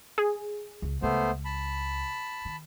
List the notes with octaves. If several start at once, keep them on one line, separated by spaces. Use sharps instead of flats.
G#4
C#2
C#2 A3 B3 C5
A5 B5
D#3